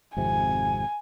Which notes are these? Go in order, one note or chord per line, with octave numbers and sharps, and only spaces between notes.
G#1 F2 C3 G#5